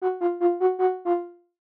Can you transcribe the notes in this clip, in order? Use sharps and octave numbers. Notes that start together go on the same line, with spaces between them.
F#4
F4
F4
F#4
F#4
F4